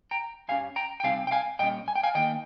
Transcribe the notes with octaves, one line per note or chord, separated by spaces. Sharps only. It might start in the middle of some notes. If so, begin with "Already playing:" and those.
G5 A#5
G2 G3 C#4 F5 G#5
G5 A#5
G5
C3 G3 C4 D#4 F5 G#5
G5
F5 G#5
A#2 G3 C#4 D#5 G5
G#5
G5
F5 G#5
D#3 A#3 D#4 D#5 G5